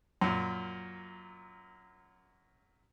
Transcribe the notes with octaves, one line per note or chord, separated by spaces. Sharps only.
F#2 A#2